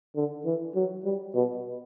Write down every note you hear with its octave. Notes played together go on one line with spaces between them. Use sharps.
D3
E3
F#3
G3
B2